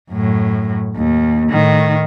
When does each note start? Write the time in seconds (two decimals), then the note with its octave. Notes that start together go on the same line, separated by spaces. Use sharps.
0.11 F#2 A2
0.96 D#2
1.50 A2 D#3